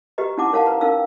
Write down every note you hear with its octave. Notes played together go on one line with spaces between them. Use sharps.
F#4 G4 B4 D#5 A#5
C#4 D#4 E4 F#5 A5 D6
A#4 C#5 F5 F#5 A5
B4 A#5
C#4 D#4 A#4 F5 E6